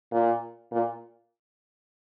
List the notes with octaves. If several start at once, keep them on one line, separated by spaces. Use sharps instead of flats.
A#2
A#2